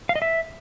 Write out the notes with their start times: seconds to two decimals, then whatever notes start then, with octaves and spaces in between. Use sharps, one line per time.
0.09 F5
0.16 D#5
0.22 E5